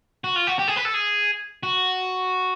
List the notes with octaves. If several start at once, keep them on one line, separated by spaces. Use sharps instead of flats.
F#4
F4
F#4
G4
G#4
B4
A4
G#4
F#4